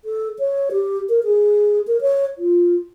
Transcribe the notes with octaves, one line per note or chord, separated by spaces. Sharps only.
A4
C#5
G4
A#4
G#4
A#4
C#5
F4